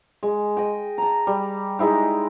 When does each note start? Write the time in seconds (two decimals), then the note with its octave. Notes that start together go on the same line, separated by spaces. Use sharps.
0.23 G#3
0.57 D#5 G5
0.98 A5 A#5
1.27 G3
1.79 G#3 D#4 E4 G5